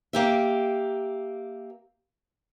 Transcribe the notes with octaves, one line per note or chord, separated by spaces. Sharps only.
A#3 G4 E5